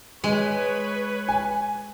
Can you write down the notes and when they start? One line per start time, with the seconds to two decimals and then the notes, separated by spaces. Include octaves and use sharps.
0.24 G#3 B4 C#5
1.28 G#5